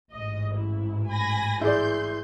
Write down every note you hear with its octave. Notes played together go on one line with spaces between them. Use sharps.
A1 G#2 D#5
E4
G#5 B5 A#6
E3 E4 G#4 D5 C6 G6